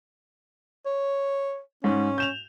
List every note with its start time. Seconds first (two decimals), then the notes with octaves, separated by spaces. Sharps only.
0.86 C#5
1.84 G#2 C#4
2.18 G6 E7 F7